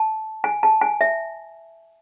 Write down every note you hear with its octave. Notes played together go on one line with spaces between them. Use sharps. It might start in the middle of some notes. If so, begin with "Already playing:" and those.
Already playing: A5
G#5
A5
G#5
E5